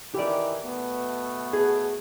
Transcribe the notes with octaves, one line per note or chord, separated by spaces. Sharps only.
D#3 E3 E4 G4 D5
B2 A3 B3
G#4